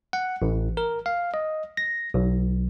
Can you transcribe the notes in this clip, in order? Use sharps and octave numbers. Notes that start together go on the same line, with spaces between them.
F#5
A1
A#4
F5
D#5
A#6
B1